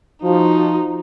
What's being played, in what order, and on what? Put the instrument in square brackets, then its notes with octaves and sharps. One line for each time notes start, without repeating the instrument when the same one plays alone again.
[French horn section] F3 [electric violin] D#4 [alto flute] F#4